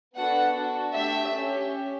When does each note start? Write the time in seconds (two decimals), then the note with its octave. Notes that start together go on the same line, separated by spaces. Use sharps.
0.16 B3 D4 F#4 A4 F#5
0.55 D4 F#4 A4
0.94 A3 D4 G4 E5
1.34 C#4 G4